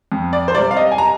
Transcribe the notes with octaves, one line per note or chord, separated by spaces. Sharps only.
F2
D5
C5
C3 G3 D5
F5
D#5
G#5
A#5